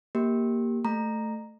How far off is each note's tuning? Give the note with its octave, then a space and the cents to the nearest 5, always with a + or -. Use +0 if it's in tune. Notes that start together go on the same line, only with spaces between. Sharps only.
A#3 +0 G4 +0
A3 +0 A#5 +0